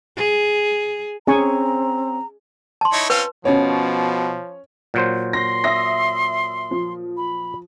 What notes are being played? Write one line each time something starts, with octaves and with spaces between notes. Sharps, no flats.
G#4
C4 C#4 G#4 G#5 A#5 C#6
A5 C6
D#4 E4 C#5
C4 C#4 F4 B4
B2 F3 C#4 C#5
A#2 F#3 C5
C6 A#6
E5 D#6 A#6
F3
B5